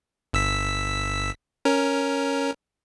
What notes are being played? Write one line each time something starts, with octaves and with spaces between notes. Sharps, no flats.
G1 E6 B6
C#4 A#4